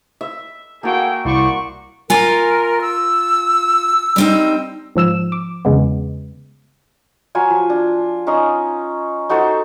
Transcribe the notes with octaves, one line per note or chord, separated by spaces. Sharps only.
E5
A#3 F#4 G#4 A4 G5
C2 E4 C5 D5 C#6
F4 A#4 G#5
E6
G3 C4 D#4
G#2 F3 E6 E7
D6
E2 C#3 G#3 B3
F#3 F4 G#5
F3
D4
C#4 D#4 C6 D#6
D#4 F#4 A4 C5